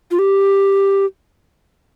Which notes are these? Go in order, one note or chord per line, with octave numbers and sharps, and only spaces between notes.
F4
G4